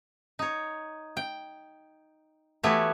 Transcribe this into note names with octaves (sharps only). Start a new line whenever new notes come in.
D#4 C#5
G5
E3 A3 B3 F#4 G4 C#5